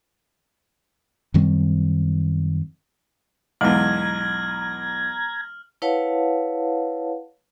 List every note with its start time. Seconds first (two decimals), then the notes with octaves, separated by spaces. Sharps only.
1.34 F#2 D#3 G3 C4
3.61 B1 E2 G#3 A#5 F6 G#6 F#7
5.82 E4 B4 C#5 F5 F#5 A5